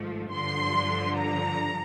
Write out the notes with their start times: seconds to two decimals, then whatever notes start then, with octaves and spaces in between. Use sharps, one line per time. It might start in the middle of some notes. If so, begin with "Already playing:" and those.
Already playing: G#1 G#2 F3 A3
0.32 G2 D3 F3 C6
1.18 A#5